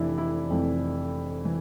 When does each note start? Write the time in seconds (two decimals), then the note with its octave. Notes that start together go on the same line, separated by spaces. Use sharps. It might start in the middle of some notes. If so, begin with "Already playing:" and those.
Already playing: F1 F2 E3 D4 E4
0.18 E4
0.49 F1 F2 E3
1.45 E3